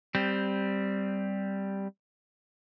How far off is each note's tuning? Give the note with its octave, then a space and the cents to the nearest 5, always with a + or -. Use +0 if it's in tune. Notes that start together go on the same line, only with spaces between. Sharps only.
G3 +0 C4 +0